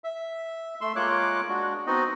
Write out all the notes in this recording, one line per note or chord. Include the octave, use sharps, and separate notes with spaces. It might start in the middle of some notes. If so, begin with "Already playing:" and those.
E5
A3 C6 E6
G#3 A#3 F4 C#5 D6 F#6
G#3 D4 F#4
B3 C4 D#4 F#4 D#5